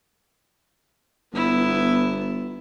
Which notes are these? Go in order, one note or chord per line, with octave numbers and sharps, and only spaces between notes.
G1 B3 E4